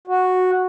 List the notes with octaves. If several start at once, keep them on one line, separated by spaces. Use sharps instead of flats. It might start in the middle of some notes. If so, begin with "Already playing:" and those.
F#4